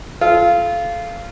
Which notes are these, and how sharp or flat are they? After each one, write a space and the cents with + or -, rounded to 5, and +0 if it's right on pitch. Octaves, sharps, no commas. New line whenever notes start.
F4 -15 A4 -35